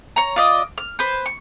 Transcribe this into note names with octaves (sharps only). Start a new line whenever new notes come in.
C#5 A#5
F4 D5 D#5
F6
B4 C5
C#6